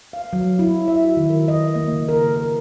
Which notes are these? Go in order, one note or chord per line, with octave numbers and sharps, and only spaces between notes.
F5
F#3
E4
E5
F#4
D#3
A#4
D#5
A#3
C#3
A#4
A#4